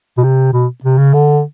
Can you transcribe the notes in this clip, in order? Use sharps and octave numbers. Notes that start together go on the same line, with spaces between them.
B2
C3
B2
C3
C#3
D3